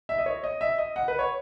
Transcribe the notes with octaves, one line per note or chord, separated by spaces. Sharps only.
E5
D#5
C#5
D#5
E5
D#5
F#5
B4
C#5